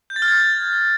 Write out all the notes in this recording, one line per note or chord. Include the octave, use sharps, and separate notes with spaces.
G6
A6
F6
G#6